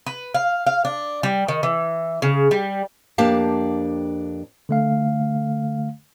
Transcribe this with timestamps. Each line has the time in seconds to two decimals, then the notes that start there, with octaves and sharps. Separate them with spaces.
0.06 B4
0.34 F5
0.66 F5
0.85 D4
1.23 G3
1.48 D#3
1.63 E3
2.22 C#3
2.51 G3
3.18 F2 A#3 D4 G4 F5 A5
4.69 D3 A3 F5